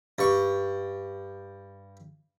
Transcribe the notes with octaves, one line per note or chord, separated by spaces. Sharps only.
G2 C#6